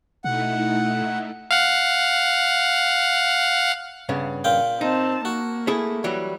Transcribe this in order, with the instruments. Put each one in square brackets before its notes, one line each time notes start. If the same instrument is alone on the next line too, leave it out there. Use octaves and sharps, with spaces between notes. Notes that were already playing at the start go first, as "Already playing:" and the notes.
[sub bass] B2 [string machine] A3 D#4 E4 [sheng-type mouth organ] F#5
[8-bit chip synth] F5 F#5
[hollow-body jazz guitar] G2 C#3 B3
[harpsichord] A#2 F4 G5
[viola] C4 A5 [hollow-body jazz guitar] D#4
[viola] A#3 [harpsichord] F#4
[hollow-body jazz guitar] A3 E4 G#4
E3 F#3 G3